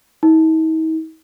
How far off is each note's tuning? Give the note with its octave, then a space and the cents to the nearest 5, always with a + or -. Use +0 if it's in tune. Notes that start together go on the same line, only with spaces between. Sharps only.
D#4 +45